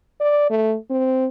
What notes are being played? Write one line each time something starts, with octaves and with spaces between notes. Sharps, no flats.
D5
A3
C4